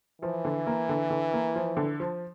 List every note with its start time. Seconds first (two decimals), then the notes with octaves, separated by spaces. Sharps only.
0.21 E3 F3
0.45 D3
0.67 A#3
0.89 D3
1.10 D3
1.33 A#3
1.56 F3
1.77 D3
2.00 F3